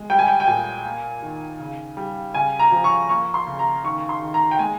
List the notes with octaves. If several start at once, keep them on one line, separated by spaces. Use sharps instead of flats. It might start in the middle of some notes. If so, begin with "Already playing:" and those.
Already playing: G#3
G3 G5
G#5
G5
G5
A#2 G#5
A#3
D#3
C#3
G3
C#3 G#5
A#5
F3
C#6
A#3 C#6
C6
C#3
A#5
D#3 C#6
C6
D#3
A#5
G5
G#3 G#5